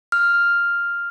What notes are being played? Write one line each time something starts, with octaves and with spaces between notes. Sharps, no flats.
F6